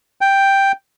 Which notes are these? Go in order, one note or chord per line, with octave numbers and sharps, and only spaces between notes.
G5